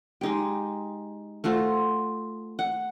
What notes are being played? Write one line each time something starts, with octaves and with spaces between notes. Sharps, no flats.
G#3 D#4 G4
A3 F4 F#4 C5
F#5